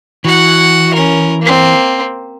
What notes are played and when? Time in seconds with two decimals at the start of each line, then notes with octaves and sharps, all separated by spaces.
0.25 E3 F#4 F#5
0.94 C#4 A#4
1.42 A#3 C4